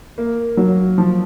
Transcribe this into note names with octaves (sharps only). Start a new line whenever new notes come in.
A#3
F#3
F3